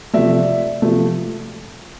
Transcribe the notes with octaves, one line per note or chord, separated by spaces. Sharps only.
C3 F3 A3 D5 E5
C3 F3 A3